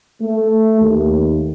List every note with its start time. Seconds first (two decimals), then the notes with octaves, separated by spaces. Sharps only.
0.21 A3
0.81 D#2